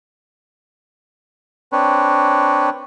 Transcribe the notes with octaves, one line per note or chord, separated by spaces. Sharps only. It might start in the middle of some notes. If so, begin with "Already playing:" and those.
C4 D4 B4 C#5